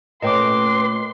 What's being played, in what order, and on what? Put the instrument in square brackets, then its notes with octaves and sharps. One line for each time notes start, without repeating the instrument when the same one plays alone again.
[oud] A#2 A3 C#4 [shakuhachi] B4 [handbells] D#5 G5 D6 [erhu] C6